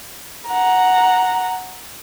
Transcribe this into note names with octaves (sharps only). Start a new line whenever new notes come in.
F#5 A#5